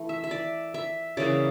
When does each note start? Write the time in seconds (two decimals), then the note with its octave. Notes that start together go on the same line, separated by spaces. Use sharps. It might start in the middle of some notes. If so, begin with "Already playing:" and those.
Already playing: E3 A3
0.09 E5
0.24 E5
0.31 D5
0.74 E5
1.17 C#3 E3 A#3 D5